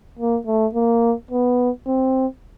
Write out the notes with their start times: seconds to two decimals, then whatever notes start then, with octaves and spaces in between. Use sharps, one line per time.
0.19 A#3
0.47 A3
0.75 A#3
1.31 B3
1.87 C4